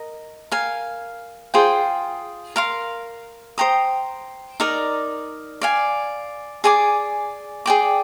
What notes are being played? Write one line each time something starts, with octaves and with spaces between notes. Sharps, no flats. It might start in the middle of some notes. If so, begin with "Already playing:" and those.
Already playing: A#4 D#5
A#4 F5 G#5
F4 G#4 C5 G5
A#4 F5 C6
C5 G5 A#5 D#6
D#4 A#4 D5
D5 F5 G#5
G#4 D5 G#5 D6
G#4 D5 G5 D6